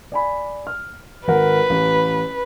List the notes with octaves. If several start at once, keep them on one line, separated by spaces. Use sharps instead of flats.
D5 G#5 B5
F6
G#1 A#4 B4 F#5
A1